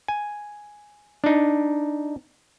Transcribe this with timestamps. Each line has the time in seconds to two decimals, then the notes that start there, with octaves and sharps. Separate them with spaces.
0.08 G#5
1.24 D4 D#4